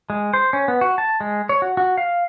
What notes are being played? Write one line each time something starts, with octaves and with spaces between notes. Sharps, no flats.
G#3
C5
C#4
B3
F#4
A5
G#3
C#5
F#4
F#4
F5